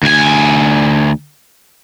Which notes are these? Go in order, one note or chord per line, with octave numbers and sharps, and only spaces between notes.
D2 G#5